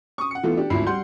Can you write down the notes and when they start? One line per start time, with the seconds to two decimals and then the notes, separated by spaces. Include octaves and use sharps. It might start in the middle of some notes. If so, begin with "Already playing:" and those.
0.18 C#6 D#6
0.31 F#5 C#7
0.43 E3 A3 B3 F4 A4
0.57 D4 G4
0.70 G#1 D2 F3 E4 B5 C7
0.86 G3 F#5 C6 G6